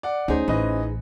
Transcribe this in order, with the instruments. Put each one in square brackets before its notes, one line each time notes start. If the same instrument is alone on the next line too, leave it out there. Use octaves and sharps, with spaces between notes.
[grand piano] D5 F#5
[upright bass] D2 [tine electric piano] C#4 C5 [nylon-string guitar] D#4 G#4
[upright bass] A1 [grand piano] E3 B4 D#5